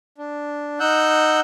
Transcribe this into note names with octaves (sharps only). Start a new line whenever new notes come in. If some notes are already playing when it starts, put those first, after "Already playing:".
D4
D#4 F#5 E6 F#6 G6